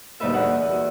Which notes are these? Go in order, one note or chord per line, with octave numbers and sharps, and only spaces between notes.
D2 G2 A#2 D#4 B4 E5
E2 F#5
F#4